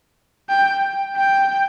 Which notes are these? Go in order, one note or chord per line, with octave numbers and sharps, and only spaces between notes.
G5
G5